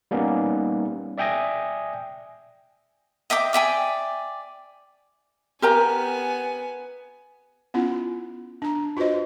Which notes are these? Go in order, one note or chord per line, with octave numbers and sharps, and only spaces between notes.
G3 A#3 B3 C#4 D#4
D5 E5 G5 G#5 D#6 A#6
D#5 E5 G5 D6
D5 E5 G5 G#5
B3 G4 A#4 G#5 A#5
B3 C#4 E4 F4
D4 A#5
F4 F#4 B4 C5 D#5